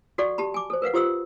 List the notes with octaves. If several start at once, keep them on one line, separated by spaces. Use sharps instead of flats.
F#4 A4 D5 F#5 C#6
G4 A5 B5
G#5 D6
A4 C5
A#4 B4 F5 F#5
F4 G4 C5 D#6 E6